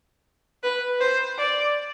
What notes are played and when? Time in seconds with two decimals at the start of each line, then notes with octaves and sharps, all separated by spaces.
0.63 B4
1.01 C5
1.38 D5